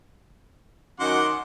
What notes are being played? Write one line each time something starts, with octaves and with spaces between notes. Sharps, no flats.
F#2 D#3 F#5 C6 D6